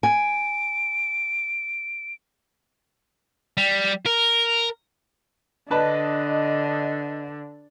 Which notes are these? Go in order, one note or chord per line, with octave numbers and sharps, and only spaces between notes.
G#5 D7
G3
A#4
D3 D4 B4 D#5 A5